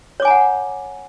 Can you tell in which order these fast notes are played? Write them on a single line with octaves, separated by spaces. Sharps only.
C#5 D6 G#5 A#5 F#5